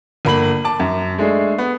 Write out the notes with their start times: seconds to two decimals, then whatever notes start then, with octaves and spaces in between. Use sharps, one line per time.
0.25 G1 A#3 B5 F#7
0.64 A5 D6
0.80 F#2
1.18 G#3 A3 D4 G#4
1.58 B3